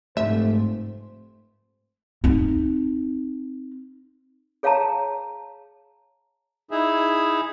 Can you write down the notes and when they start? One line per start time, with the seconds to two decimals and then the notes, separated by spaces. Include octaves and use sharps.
0.17 F1 G#2 A3 C5 E5
2.24 C4 D#4
4.63 G#4 C#5 F5 G5 A5 A#5
6.71 D#4 E4 G#4 E5